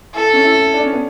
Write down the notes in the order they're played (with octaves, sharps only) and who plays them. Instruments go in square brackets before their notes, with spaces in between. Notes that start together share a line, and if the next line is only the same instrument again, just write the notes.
[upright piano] E4 [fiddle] A4
[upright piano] C#4
E4
D4
C#4
B3